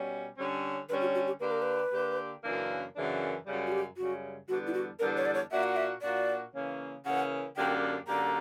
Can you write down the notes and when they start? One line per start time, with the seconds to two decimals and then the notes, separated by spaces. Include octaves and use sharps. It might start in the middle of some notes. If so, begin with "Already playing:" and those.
Already playing: B2 G3 C#4
0.37 D3 G3 C#4
0.89 D3 G3 C#4 B4
1.01 F#4
1.14 F#4
1.27 G4
1.40 D3 A#3 D4 G4 B4
1.52 A#4
1.62 B4
1.92 D3 A#3 D4 G4
2.43 F#2 C#3 E3 A#3 D4
2.95 F#2 C#3 E3 A#3 D4
3.45 F#2 C#3 G3
3.67 F#4
3.72 G4
3.96 F#2 C#3 G3 F#4
4.49 E2 D3 G3 B3 D4 F#4
4.67 E4
4.73 F#4
4.99 E2 D3 G3 B3 D4 A#4
5.17 C#5
5.25 D5
5.34 C#5
5.51 A#2 A#3 D4 F#4 E5
5.63 F#5
5.76 E5
6.02 A#2 A#3 D4 F#4 D5
6.54 C#3 E3 A#3 C#4
7.05 C#3 E3 A#3 C#4 F#5
7.56 F#2 D3 A#3 D4 G4 G5
8.08 F#2 D3 A#3 D4 G4 A#5